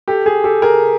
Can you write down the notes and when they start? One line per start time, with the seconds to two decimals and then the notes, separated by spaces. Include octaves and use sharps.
0.08 G4 A4
0.26 G#4
0.44 G4 A4
0.62 G#4 A#4